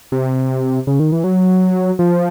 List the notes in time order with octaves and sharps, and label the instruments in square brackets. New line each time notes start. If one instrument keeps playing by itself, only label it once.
[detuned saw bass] C3
C#3
D#3
E3
F#3
F3